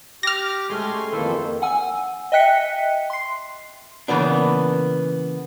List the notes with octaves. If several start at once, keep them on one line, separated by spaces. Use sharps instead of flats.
G4 D6 F6 A#6
G#3 A3 C#4 G4 G#5 C6
F2 D#3 E3 A#3 A4 C5
F#5 G#5 E6
D#5 E5 G5 F#6 B6 C#7
C6 C7
C#3 E3 A#3 B3 D4